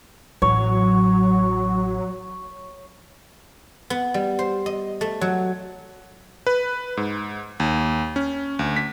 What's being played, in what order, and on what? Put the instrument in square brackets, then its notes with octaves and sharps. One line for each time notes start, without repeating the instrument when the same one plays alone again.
[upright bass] A1 [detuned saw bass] F#3 [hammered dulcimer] C#5
[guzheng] B3
G3
C5
D#5
A3
F#3
[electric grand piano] B4
G#2
D#2
C#4
D2
B6